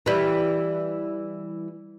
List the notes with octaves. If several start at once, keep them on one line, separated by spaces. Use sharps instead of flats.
E3 G3